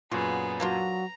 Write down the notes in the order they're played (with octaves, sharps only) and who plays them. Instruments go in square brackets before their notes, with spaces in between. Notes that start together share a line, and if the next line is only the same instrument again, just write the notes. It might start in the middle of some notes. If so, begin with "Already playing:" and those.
[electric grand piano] F#2 A#2 [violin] B3 G#4 [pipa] F4 F#4
[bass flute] F#3 [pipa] A#3 D4 F4 [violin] A#5